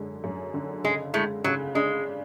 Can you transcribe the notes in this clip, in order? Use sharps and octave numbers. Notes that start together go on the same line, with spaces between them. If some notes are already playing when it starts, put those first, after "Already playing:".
Already playing: F#2 D3 G#3
F#2
D3
C#3 G#3
A2 G#3 A3
C#3 F#3
G#3 D4